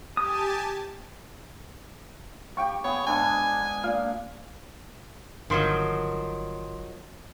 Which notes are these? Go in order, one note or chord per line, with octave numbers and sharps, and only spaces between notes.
G4 G#5 A5 D#6
G4 G5 C#6
B3 G#4 C#5
G#2 B3 D4 G#5
A#2 F5
G1 D#3 F3 F#3 C6